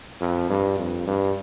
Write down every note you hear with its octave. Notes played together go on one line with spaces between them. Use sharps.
F2
G2
F2
G2